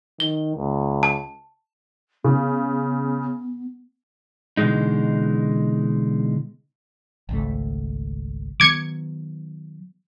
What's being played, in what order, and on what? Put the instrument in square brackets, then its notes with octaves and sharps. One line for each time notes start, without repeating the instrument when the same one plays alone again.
[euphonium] D#3 [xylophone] G7
[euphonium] C#2
[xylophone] A5
[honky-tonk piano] C#3 [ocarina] B3
[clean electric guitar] B2 D3 E3 G#3 D#4
[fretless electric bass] G#1 C#2 A3
[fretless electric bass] D#3 F#3 B3 [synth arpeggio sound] D6 G#6 C#7